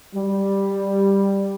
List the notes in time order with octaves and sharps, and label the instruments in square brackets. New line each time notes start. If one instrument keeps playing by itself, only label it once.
[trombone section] G3